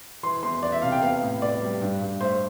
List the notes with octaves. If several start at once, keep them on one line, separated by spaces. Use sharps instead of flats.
E3 C6
E2 C6
E3 D5
E5
C3 F5
G5
B3 F5
A2
B3 D5
G3
G2
G2
A3 C5